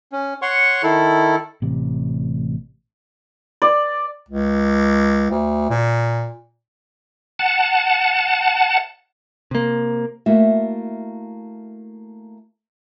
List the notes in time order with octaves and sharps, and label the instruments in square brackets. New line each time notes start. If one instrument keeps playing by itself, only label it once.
[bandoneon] C#4
C#5 F#5 C6 C#6
D#3 E4 A4
[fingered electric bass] A1 C3
[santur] D5
[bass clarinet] C#2
D2
A#2
[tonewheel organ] F#5 A5
[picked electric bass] C3 A#3
[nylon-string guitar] A3 A#3 E4 F#4 E5